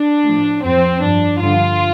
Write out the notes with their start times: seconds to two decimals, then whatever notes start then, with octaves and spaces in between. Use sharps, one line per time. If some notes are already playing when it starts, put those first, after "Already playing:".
Already playing: D4
0.24 A2 F3
0.64 F2 F3 C4
1.02 G2 F3 D4
1.41 G2 D3 F3 F4